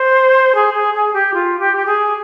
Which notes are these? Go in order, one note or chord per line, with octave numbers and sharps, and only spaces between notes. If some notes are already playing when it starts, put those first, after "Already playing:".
Already playing: C5
G#4
G#4
G#4
G4
F4
G4
G4
G#4